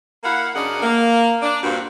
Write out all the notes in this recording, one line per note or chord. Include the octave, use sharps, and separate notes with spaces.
A#3 E4 F5 F#5
F#2 C#3 D4 A#4 D#5 F#5
A#3
D4
G2 A#2 A#3 C4 D4 F#4